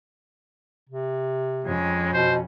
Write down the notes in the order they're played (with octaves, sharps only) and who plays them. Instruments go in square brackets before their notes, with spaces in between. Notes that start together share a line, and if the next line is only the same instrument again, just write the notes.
[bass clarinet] C3
[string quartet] F2 C#4 [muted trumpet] G#3
[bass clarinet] B2 [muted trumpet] C5